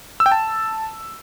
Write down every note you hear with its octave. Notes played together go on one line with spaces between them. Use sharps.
E6
G5
A5